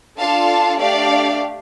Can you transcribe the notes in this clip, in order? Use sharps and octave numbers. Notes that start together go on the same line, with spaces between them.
D4 F4 A4 F5 A5
A3 D4 G4 D5 F5